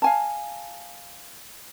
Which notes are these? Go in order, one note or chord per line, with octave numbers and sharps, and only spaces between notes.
F5 G#5 A5